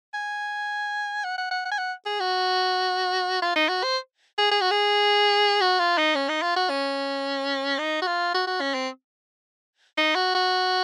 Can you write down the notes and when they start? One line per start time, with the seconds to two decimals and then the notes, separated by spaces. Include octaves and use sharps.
0.14 G#5
1.24 F#5
1.38 F#5
1.51 F#5
1.65 F#5
1.72 G#5
1.78 F#5
2.06 G#4
2.20 F#4
3.42 F4
3.56 D#4
3.69 F#4
3.83 C5
4.38 G#4
4.51 G#4
4.61 F#4
4.71 G#4
5.61 F#4
5.79 F4
5.98 D#4
6.15 C#4
6.29 D#4
6.43 F4
6.57 F#4
6.70 C#4
7.79 D#4
8.02 F#4
8.07 F4
8.35 F#4
8.47 F#4
8.61 C#4
8.74 C4
9.98 D#4
10.15 F#4
10.35 F#4